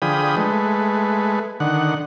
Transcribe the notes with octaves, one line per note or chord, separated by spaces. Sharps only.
D3 F3 G#4 G5 B5 D#6
G#3 A3 B4
D3 D#3 F#5